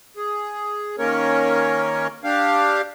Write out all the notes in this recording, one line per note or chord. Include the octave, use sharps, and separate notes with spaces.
G#4
D#3 A#3 C#4 A#4 C#5
D4 G4 F5